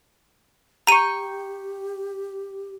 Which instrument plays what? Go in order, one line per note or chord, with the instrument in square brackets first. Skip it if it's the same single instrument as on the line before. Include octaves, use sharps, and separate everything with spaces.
[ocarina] G4 [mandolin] G5 C#6 [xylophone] A#5 D#7